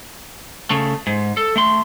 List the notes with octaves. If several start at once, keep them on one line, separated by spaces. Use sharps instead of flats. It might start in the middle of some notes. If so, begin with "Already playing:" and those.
C#3 A3
G#2
A4
A3 C6